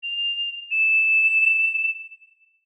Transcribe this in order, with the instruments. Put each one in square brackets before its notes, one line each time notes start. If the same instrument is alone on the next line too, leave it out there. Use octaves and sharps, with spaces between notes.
[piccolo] F7
E7